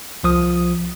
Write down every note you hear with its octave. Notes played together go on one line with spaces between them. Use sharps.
C2 F3 D#6